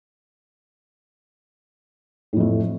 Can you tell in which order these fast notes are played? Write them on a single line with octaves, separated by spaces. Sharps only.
A2 F2 A3